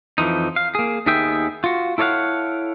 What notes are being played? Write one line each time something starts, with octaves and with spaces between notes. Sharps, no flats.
F2 E3 F3 D#4
F5
A#3 G#4
D#2 D#3 B3 G#4 E5 G5
F4 F#4
E4 A4 C#5 D5 F5 F#5